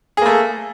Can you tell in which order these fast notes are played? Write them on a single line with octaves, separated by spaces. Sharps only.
G#4 A#3 A3